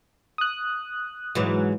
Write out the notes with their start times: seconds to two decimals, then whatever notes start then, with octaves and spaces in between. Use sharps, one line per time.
0.38 D#6 F#6
1.35 G#2 E3 F#3